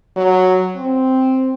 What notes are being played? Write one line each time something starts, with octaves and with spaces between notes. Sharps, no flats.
F#3
C4